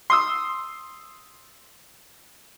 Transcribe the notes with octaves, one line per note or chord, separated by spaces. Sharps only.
C6 D#6 E6